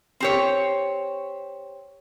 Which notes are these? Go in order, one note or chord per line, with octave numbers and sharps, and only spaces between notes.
C4 G4 C#5